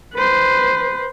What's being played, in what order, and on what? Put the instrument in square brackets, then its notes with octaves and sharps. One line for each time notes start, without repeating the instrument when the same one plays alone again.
[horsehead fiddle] B4 C5